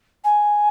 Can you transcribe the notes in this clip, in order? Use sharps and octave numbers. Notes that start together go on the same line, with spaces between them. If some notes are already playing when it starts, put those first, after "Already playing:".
G#5